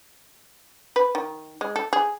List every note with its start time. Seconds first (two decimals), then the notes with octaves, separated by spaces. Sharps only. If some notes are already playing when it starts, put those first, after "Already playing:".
0.96 B4
1.15 D#3
1.61 G#3
1.76 A4
1.93 G#4